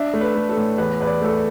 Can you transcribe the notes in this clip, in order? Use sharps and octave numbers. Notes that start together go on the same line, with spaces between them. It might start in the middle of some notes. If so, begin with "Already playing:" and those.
Already playing: D4 E5
A3
B4
A3
A4
A2
E2 B4
E2 B4
D5
A3 A4